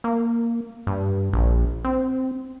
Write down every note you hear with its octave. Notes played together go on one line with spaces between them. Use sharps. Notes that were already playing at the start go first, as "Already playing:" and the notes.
A#3
G2
A#1
C4